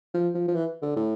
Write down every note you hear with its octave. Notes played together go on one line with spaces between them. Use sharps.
F3
F3
F3
E3
D3
A2